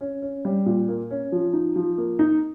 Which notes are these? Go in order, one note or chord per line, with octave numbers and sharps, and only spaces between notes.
C#4
C#4
G3
A#2
A#3
C#4
F3
D#4
F3
A#3
D#4